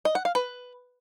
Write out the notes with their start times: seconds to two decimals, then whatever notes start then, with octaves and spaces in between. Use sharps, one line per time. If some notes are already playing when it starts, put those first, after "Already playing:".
0.05 D#5
0.15 F#5
0.25 F5
0.35 B4